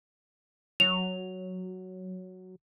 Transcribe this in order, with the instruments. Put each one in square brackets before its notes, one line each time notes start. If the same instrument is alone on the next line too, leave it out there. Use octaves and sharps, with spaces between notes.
[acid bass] F#3 [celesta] F7